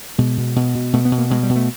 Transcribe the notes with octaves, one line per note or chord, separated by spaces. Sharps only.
B2 G#3
B2
B2
B2
B2 A3
B3
B2
A#3
B2 G#3
G3
B2
A3